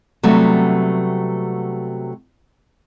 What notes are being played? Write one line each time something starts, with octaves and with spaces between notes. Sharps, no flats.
C3 F#3 G3 A3 B3